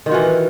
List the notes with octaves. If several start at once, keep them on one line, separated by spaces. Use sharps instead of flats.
D#3 E3 F4 F#4